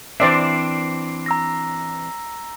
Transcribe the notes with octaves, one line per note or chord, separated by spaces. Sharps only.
E3 C4 D4 C5 D5 E5 C7
A#5 E6 A#6